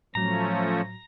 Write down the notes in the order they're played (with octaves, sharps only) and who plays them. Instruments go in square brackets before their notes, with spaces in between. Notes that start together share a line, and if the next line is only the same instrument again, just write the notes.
[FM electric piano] A2 F#3 [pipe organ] F3 A3 C#4 [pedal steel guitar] A#5